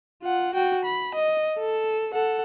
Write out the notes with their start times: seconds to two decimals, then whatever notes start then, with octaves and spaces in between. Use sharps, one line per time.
0.22 F4 F#5
0.54 F#4 G5
0.85 B5
1.14 D#5
1.59 A4
2.13 A4 F#5